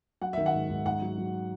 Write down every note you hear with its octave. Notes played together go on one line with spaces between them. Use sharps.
F#3 F#5
D#3 E5
F#5
G#2
G#2
G#2 F#5
F#3
F#3